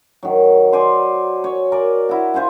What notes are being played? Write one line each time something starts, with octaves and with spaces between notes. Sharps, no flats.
D#3 F#3
C5 D5 G#5 C6
C#5
A#4 D5 G#5 A#5
E4 F#4
F4 C5 F#5 G#5